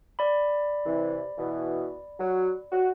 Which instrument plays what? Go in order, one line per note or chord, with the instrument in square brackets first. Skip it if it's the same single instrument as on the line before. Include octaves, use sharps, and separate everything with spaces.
[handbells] D5 B5
[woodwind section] C3 E3
B2 E3
F#3
F#4